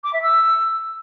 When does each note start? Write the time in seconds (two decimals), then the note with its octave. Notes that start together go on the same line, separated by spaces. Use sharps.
0.04 D6
0.13 E5
0.22 E6